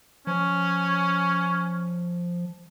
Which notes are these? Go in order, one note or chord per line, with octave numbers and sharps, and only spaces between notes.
F3 C#4